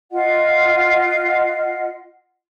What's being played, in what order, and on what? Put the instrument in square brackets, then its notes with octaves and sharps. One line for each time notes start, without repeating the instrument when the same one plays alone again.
[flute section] F4 D#5 F#5